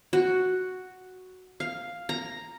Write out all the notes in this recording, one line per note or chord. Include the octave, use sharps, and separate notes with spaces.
F#4
F5
A#5